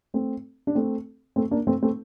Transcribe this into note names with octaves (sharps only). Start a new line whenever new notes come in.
A3 C4
D4
A3 C4
A3 C4
A#3 D4
A3 C4
A3 C4